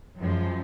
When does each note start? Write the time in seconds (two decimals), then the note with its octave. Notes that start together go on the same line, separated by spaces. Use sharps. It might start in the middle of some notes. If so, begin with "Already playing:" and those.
0.18 F#2 F3 G#3